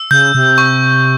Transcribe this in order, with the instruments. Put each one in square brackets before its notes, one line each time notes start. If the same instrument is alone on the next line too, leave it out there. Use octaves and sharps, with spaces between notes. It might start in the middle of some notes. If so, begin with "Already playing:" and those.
Already playing: [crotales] E6
[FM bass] C#3 [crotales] G6
[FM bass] C3
[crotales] C#6